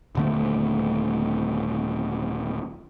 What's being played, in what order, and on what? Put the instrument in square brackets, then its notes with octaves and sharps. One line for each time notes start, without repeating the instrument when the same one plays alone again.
[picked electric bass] D#1 D3 A3